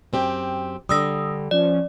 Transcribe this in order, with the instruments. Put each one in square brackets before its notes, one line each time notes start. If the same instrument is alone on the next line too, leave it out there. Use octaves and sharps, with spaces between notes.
[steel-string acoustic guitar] F#2 C4 G4
[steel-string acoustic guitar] D3 G3 [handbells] D#6 E6 A#6
[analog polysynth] F3 C#4 [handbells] D5